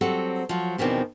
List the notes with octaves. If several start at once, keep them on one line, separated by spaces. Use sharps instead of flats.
F#3 G3 C4 A4 F#5
F3 F#3
E2 B2 D#3 F3 C4 D4